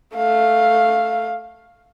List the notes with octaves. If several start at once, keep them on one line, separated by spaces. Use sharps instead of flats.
A3 F5